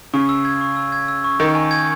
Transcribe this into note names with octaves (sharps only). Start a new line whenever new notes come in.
C#3 C#6
E6
G#6
C#6
E6
G#6
E6
C#6
D#3 C#6
G#5
G#6